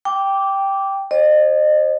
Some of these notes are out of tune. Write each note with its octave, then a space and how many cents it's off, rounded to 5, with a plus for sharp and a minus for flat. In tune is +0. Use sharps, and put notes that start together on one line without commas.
G5 +0 D6 -10
C5 +25 D#5 -35